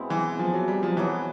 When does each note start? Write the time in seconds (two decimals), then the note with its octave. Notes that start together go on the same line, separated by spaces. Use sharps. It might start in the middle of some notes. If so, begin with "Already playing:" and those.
Already playing: B2 G#3 C4 E4
0.10 E3
0.39 F3
0.53 F#3
0.68 G3
0.83 F3
0.97 B2 E3 F#3 B3